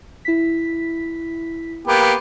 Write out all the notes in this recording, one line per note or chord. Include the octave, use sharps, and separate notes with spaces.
E4 B6
A#3 B3 G4